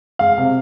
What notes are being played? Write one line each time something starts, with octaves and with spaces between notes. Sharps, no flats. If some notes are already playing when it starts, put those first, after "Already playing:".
G#3 F5
C3